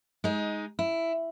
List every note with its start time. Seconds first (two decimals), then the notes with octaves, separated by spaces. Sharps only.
0.24 G#3 D#4
0.79 E4